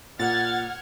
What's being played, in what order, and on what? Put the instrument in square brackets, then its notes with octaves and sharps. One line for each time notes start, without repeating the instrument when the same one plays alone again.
[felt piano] A#2 [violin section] F#5 F6 G#6 [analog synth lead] A6